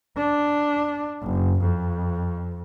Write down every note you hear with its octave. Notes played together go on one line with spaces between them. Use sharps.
D4
F#1
F2